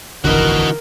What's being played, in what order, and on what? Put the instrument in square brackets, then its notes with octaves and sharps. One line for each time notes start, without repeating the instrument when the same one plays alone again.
[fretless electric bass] F1 A#1 D#2 [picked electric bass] D3 E3 [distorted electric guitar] F#4 D#5 [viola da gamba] A#4